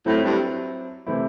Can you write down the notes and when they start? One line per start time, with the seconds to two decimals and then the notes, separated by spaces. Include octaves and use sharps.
0.06 A2 F#3 C4 E4
0.23 G2
1.07 C3 E3 A3 C4 E4